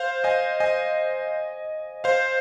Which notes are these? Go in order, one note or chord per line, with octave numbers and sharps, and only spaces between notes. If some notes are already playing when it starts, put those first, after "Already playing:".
Already playing: C5 F5
D#5 G#5
D#5 G#5
C5 F5